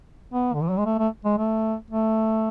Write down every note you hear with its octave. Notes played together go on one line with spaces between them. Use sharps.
B3
D3
E3
F#3
G#3
A3
A3
G#3
A3
A3